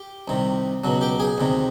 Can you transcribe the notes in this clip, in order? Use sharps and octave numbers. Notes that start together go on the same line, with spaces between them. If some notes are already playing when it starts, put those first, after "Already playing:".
Already playing: G4 G5
C2 C3 D#3
C#2 B2 F#3
G4 G5
G#4 G#5
D2 C3 D#3